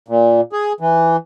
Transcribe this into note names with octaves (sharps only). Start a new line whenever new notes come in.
A#2
G#4
E3